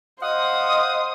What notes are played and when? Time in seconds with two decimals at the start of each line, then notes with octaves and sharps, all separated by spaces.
0.22 C5 D#5 F5 F#5 D#6